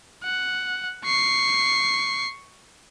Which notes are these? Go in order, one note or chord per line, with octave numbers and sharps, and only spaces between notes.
F#5
C#6 C7